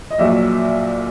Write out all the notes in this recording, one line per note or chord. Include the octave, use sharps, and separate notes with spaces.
D#5
A#1 A#2 F#3 E5